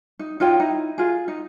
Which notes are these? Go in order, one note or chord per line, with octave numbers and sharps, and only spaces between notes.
D#4
D#4 F4 C#5 G5
D#4 E4
F4 G#4
D#4